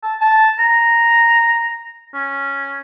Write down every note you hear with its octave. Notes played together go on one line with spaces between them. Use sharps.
A5
A5
A#5
C#4